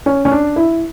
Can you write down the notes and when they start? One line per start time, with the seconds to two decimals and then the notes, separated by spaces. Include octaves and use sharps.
0.06 C#4
0.25 C#4
0.31 D4
0.56 E4